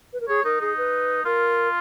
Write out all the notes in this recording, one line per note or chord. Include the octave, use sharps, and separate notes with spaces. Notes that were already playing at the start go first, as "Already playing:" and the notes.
B4
A#4
G#4 C#5
D#4 A#4
D#4 G#4
B4
F4 A#4